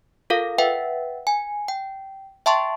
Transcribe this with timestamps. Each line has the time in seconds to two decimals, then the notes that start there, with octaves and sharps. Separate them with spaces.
0.30 F4 A4 A#4 F5
0.58 B4 E5 F#5 G5
1.27 G#5
1.68 G5
2.46 E5 G5 A5 C6 C#6